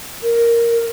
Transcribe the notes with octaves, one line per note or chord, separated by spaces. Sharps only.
A#4